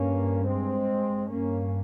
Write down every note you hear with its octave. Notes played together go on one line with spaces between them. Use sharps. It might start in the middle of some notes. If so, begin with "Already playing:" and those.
Already playing: G2 A#3 C#4
G#3 C4
G2 A#3 C#4